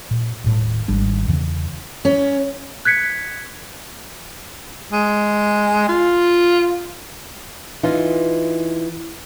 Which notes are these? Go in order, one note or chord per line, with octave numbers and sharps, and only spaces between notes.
A#2
D#1 A2
G#1 G3 D4
E2 C#3 E3
C#4
F#6 G#6 B6 C#7
G#3
F4
E3 D#4 F4